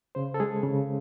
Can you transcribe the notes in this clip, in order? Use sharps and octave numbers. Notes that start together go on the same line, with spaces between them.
C#3 C5
A4
G#3 G#4
C#3